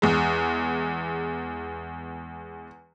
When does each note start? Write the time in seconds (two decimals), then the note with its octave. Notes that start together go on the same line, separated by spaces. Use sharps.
0.02 E2 G#3